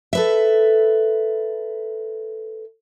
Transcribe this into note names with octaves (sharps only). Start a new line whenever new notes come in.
A4 B4 E5